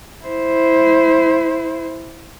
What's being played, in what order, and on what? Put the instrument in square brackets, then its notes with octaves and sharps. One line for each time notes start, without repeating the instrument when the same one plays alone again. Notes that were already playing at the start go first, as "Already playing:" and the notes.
[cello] E4 C5